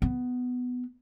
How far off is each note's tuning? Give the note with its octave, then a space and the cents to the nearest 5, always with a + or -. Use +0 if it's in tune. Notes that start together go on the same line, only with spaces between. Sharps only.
B3 +10